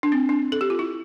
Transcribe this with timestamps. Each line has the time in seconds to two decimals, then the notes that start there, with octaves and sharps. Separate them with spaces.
0.03 D4
0.12 C4
0.29 D4
0.52 A4
0.61 G4
0.70 F4
0.79 E4